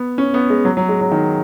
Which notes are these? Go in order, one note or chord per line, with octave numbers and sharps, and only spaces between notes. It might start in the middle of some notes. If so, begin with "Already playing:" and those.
Already playing: B3
C#4
B3
G#3
F#3
F#3
G#3
F#3
D#3